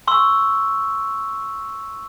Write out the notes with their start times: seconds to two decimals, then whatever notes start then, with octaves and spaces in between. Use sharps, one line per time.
0.08 C6 C#6 E6